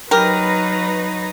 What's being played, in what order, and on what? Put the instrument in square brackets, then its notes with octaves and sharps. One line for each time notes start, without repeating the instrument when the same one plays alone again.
[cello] F#3 D#4 [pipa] G4 A#4 [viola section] B4 A#5